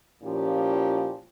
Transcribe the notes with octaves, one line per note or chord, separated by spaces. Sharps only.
A#2 F3 C#4 E4 G4